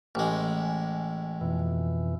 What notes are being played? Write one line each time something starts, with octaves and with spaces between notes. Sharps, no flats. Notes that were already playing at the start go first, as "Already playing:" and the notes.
A1 G#3
F2 B2 E3